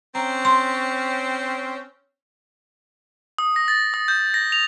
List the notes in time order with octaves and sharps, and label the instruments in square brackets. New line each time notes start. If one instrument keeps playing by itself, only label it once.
[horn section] C4 C#4 [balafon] A#5
[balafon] C6
[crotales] D#6
A#6
A6
D#6
G6
A#6
F7